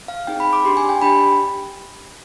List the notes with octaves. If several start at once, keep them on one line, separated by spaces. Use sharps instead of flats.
F5
C4 D#4 G#4 G5
B5
D6
D4 G4 C6
G#5
G5
D4 G4 B5